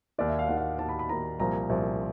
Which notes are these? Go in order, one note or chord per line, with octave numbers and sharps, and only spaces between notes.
D#2 D#3 D5
E5
F5
D#2 D#3 F#5
F5
D#2 D#3 A5
B5
B5
D#2 D#3 A#5
C2 A#2 F3 A#5
C2 A#2 F3